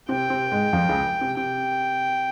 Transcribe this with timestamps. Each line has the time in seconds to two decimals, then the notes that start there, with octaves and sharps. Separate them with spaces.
0.09 C3 C4 G5
0.30 C3 C4
0.51 G#2 G#3
0.73 F2 F3
0.89 C#2 C#3
1.21 C3
1.37 C3 G5